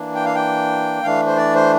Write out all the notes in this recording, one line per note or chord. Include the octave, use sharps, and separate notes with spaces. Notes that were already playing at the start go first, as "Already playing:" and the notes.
Already playing: E3 A#3 D4
G5
F5
G5
E3 A3 D4 F5
C5
D5
C5